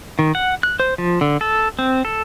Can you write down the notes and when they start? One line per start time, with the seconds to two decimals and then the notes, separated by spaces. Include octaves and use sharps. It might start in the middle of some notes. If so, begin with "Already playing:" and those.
0.19 D#3
0.35 F#5
0.63 F#6
0.80 C5
0.98 F3
1.21 D3
1.41 A4
1.79 C4
2.05 A4